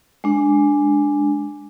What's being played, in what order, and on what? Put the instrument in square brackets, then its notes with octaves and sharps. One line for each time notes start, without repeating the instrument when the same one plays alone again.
[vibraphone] G#3 D4